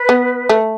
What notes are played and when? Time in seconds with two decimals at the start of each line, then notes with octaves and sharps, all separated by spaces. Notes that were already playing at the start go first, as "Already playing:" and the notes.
Already playing: B4
0.09 B3
0.49 A3